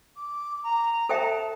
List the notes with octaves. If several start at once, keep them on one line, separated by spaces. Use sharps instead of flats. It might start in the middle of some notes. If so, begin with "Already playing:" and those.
D6
A#5
A4 C5 E5 G5 A5
A#5
A5